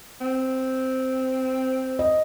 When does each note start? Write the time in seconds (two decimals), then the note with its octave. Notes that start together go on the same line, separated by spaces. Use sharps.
0.21 C4
1.99 D#5